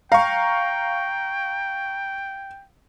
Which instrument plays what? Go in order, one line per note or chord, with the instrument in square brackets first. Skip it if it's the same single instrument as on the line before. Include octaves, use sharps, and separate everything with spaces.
[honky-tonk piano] F5 [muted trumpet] G5 [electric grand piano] A#5 C#6